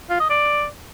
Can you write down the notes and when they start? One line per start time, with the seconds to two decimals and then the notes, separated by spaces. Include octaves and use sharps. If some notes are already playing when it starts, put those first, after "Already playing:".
0.10 F4
0.20 D#5
0.30 D5